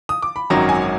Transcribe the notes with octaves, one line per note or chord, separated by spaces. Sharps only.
D#6
D6
B5
G#1 F#2 D#3 F#3 A#5
G#5